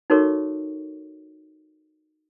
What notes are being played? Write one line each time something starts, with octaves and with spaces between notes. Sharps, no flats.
D#4 F#4 A4 A#4 C#5 C#6